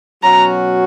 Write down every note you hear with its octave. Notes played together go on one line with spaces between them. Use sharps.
B2 F#3 C#4 F#4 A#5